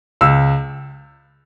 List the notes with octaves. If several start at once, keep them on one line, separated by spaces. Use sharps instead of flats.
C#2 E6